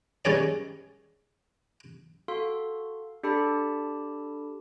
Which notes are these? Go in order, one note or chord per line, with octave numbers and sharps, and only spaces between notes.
D#3 G3 C#4 G#4 D5
F#4 A4 F5 C6
D4 G4 A4 A5 B5